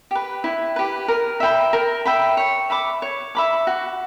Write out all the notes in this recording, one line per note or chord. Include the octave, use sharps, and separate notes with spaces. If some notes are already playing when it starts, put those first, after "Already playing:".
G4 B4
E4
G4 B4
A#4
E5 G5 B5
A#4
E5 G5 B5
C#5
E5 B5 D6
C#5
E5 B5 D6
F#4